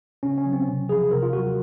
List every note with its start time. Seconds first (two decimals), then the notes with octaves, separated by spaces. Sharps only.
0.23 C#3 C#4
0.38 C#4
0.45 F#3
0.53 C4
0.67 C3
0.89 F3 G#4
1.11 C3 A#4
1.23 F4
1.33 F#3 F#4